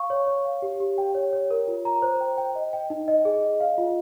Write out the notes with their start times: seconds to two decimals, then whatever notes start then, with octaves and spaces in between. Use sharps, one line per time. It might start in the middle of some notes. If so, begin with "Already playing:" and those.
Already playing: F5 C#6
0.10 C#5
0.27 C#5
0.45 F5
0.62 G4
0.80 G4
0.98 G5
1.15 C#5
1.33 C#5
1.51 A#4
1.68 F4
1.85 A#5
2.02 C5
2.21 G5
2.38 G5
2.55 D#5
2.73 G5
2.90 D#4
3.08 D#5
3.25 G#4
3.43 D#5
3.60 F5
3.78 F4